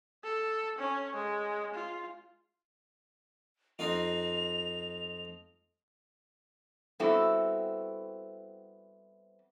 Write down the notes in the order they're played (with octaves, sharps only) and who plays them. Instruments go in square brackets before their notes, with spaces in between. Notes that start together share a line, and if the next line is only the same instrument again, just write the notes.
[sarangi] A4
C#4
G#3
F4
[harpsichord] F2 D#4 F4 [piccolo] F7
[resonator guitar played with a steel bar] G3 B3 C4 E4 F#4 A4